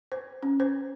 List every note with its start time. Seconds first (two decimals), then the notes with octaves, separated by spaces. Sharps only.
0.12 C5
0.43 C#4
0.60 C5